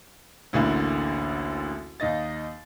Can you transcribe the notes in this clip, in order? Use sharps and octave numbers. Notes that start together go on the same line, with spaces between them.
A1 D2 D3 A#3 E4
D#2 D#4 D#5 A6